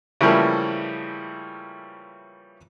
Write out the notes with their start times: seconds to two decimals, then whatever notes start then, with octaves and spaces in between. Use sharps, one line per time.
0.21 C#3 E3 F3 G3 A3 A#3